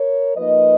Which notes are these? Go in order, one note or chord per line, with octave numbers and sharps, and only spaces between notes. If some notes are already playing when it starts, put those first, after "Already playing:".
Already playing: A#4 C#5
F3 A#3 D#4 B4 D#5